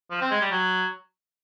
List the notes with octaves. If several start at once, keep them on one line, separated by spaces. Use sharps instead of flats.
F3
C4
G#3
G3
F#3